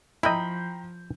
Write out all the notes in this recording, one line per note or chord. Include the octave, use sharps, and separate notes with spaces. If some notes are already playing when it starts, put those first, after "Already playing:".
F3 E4 D#5 G5 A#5 B5 G6